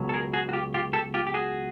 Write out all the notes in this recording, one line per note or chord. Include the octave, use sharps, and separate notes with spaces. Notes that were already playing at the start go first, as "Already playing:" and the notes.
Already playing: C#2 B2 F#3
A4
G#4 A#4
F#4 G#4
F#4
F4 G4
F4 G4
G4 A4
F4 G4
G4
F#4 G#4